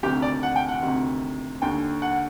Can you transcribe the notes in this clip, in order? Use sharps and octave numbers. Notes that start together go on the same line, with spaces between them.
D2 C3 D#3 G4
D5
F#5
G5
F#5
D2 C3 D#3
D#2 D3 G5
F#5